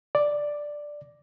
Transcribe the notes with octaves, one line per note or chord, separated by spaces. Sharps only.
D5